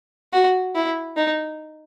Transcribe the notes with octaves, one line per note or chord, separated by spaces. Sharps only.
F#4
E4
D#4